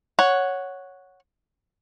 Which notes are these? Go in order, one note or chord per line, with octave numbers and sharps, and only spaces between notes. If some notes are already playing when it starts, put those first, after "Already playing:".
C#5 F#5